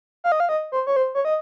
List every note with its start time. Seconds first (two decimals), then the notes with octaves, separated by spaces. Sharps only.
0.24 F5
0.32 D#5
0.40 F5
0.49 D#5
0.72 C5
0.87 C#5
0.96 C5
1.15 C#5
1.25 D#5